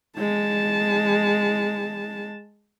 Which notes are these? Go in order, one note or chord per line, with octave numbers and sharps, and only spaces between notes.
G#3 A5